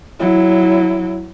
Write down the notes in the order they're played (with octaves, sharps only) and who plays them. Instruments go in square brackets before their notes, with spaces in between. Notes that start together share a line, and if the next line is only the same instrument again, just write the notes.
[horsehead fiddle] F#3 E4